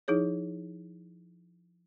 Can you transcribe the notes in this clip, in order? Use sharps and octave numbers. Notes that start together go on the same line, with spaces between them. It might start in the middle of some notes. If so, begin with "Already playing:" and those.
F3 D#4 E4 G#4 C#5